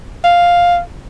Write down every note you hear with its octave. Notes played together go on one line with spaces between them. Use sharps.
F5